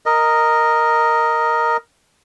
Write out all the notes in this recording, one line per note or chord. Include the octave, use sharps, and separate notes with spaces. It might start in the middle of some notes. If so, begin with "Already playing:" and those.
A#4 D#5